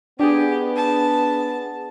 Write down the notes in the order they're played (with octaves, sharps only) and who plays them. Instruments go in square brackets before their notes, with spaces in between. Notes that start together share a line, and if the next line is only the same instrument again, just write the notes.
[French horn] B3 [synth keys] D4 G#4 [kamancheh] G4
[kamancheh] A5